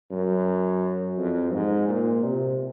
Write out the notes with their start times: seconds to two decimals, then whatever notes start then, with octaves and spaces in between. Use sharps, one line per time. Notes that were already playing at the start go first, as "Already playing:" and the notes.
0.11 F#2
1.18 F2
1.53 G#2
1.89 A#2
2.24 C3